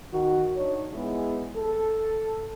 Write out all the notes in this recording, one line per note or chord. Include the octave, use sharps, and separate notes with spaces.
D#3 F#4
D4 D#4 C#5
G#3 B3 E4 G#4
A4